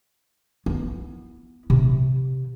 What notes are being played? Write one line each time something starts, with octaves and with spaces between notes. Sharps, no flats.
B3 E4
C3